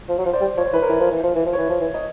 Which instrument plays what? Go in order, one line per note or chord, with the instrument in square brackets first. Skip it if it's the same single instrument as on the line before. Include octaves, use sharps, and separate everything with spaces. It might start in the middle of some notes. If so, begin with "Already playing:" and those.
[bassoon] F3
F#3
F3
[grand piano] C5 D5
[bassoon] G3
[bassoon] F3 [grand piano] C#5
[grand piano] C5
[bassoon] E3 [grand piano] B4
[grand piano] A#4 C5
[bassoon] E3
F3
E3
F3
E3
F3
[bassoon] E3 [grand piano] B4 C#5
[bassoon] F3
E3
[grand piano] D#5